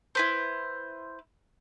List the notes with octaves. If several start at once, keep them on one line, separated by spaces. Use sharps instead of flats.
E4 B4 C5